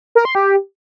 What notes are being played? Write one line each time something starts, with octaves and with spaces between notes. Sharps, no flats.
A#4
C6
G4